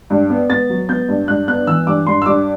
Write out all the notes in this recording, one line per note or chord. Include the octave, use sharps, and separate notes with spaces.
G2
B3
B3 A6
F#3
B3 G6
G2
G2 F#6
B3 F#6
E3 E6
G2 D6
G2 C6
E6
G2 D6